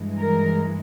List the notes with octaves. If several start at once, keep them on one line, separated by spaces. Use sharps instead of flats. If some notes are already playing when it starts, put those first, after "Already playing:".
Already playing: G2 E3 G#3
A#4